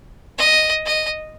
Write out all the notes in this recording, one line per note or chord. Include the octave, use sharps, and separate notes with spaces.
D#5
D#5